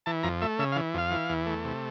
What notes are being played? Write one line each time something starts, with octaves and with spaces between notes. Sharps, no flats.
E3 A5
F2 A#5
A3 E5
C#3 E5
F5
E3
F2 F5
E3
E2
A3
C3